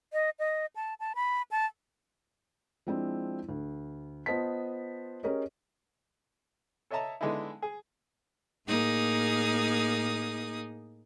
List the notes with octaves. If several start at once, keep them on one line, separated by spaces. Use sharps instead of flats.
D#5
D#5
A5
A5
B5
A5
F3 G#3 C4 D4 E4
D2
B3 F4 C5 D#5 A5 B6
C#4 G4 G#4 A#4 C#5 D#5
A4 C#5 D#5 E5 A5 A#5
D3 G#3 B3 D#4 E4
G#4
A2 A#3 D#4 G#4 D#6